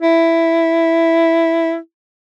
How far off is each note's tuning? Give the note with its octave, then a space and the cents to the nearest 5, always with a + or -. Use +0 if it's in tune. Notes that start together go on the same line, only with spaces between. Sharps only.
E4 +5